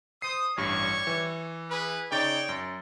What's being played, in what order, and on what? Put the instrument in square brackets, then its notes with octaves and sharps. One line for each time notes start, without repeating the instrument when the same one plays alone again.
[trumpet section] C5 D#6 [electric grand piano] C7
[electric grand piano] A1 G2 [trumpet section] G3 C#5 C#6
[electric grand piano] E3
[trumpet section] G#4 B4
[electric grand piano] C#3 D#4 A6 [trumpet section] C#5 D5 G5
[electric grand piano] F#2